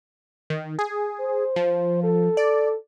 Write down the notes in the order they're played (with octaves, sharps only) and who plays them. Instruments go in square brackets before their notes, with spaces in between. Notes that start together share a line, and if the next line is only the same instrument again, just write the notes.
[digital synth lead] D#3
G#4
[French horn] C5
[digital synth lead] F3
[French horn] A4
[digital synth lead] D5